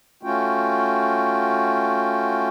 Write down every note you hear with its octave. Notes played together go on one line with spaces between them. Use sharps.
A3 C#4 F4 F#4 G5